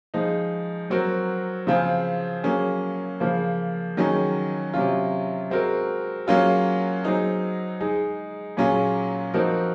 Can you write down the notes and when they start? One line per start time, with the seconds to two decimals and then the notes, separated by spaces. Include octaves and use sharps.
0.14 F3 G#3 D#4
0.90 F#3 C4 F#4 A#4
1.67 C#3 F3 C4 F4 G#4
2.43 F#3 A#3 C#4 G#4
3.20 C#3 F3 A#3
3.97 D#3 F#3 C#4 G#4
4.74 C3 F#3 C#4 F4
5.50 G#3 C4 F#4 A#4
6.27 F#3 A#3 C#4 F4 G#4
7.04 F#3 C4 D#4 G#4
7.81 G#3 D#4 G#4
8.57 A#2 F#3 C#4 F4 G#4
9.34 F3 C4 D#4 F#4 A#4